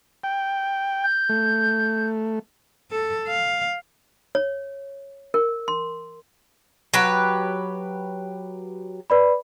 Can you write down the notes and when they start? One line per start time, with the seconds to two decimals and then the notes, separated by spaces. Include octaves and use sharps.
0.24 G5
1.04 G6
1.29 A3
2.91 A4
3.28 F5
4.35 C#5
5.34 A#4
5.68 C6
6.94 F#3 G4 B4
9.10 B4 D5 B5